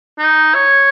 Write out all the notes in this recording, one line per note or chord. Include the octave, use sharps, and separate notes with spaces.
D#4
C#5